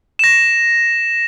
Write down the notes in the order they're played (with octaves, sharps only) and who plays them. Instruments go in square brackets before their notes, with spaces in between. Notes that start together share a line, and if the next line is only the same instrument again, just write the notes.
[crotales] A#6 E7